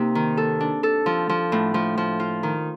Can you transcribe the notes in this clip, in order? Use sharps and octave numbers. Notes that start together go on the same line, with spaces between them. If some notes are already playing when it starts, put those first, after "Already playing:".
Already playing: C3 A#3 D#4
D#3
A4
D4
A4
F3
F3
A2
F3
F3
F4
D#3